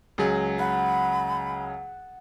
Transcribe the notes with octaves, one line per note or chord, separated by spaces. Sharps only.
C#2 F#3 G#4
F#5 B5